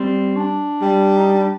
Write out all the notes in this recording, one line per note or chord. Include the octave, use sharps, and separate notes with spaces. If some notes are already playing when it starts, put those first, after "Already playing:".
Already playing: G3 C4
D4
G3
D#4
D4